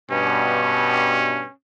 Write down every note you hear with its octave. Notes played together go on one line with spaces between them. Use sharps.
G2 B2 C#4